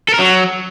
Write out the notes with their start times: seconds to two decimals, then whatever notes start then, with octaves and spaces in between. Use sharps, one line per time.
0.08 A4
0.14 A#4
0.19 F#3